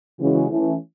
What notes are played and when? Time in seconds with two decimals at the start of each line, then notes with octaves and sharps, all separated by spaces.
0.20 C#3 E3 G#3 C#4 F#4
0.50 E3 A3 C#4